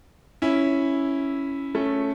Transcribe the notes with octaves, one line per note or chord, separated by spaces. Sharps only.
C#4 E4
A3 C#4